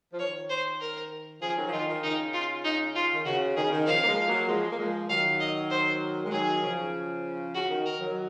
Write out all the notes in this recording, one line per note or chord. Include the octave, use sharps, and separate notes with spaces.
F3
D#3 C#5
C5
A#4
C#3 F3 G#4
D#3 F#3
F3
D#3 F4
D#3
C#3 D#4
F4
D#4
F4
D#3
C#3 F#4
D#3 G#4
C#3
D#3
C#3 F3 F5
A#3
F3 G#3
F#3 A#3
F3 G#3
A#3
F3 G#3
D#3 F#3 F5
D#5
C5
G#3
D#3 F#3 G#4
C#3 F3
C#3 F#4
D#3
A#4
D#3 F#3